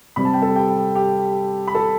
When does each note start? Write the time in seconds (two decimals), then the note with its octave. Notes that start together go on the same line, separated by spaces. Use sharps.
0.16 C3 G3 C4 B5
0.25 A5
0.34 G5
0.42 A4 A5
0.56 G4 G5
0.95 G4 G5
1.68 B5
1.75 A4 A5